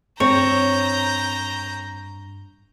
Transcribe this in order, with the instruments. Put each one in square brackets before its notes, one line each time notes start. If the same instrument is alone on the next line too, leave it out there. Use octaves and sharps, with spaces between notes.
[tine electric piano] G2 D4 [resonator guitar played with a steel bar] C4 [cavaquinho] C#5 [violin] A#5 G6